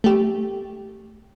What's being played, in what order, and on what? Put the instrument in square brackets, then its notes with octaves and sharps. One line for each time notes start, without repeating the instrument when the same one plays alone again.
[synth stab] A3 G4